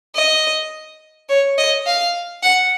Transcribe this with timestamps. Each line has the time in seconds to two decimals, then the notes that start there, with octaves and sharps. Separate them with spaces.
0.15 D#5
1.29 C#5
1.58 D#5
1.87 F5
2.43 F#5